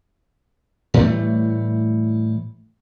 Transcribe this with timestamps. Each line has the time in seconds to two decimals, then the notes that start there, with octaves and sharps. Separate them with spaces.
0.94 A2 E3 G3 A3